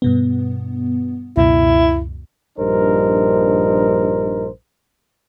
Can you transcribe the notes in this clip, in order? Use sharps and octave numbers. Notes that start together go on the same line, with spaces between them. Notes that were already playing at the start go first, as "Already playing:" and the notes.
G2 B2 B3
C#2 F#2 B2 E4
A#1 G2 D#4 A#4 C5